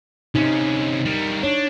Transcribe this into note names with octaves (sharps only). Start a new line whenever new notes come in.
C3 C#4 D#4
G3 A#4
D4 C#5